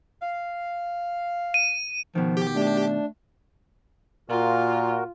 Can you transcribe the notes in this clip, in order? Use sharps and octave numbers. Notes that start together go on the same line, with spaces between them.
F5
D#7
B2 D#3 F3
G4
A3 D4
A#2 F4 F#4 A#4